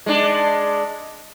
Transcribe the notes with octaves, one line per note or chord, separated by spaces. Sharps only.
G#3 D4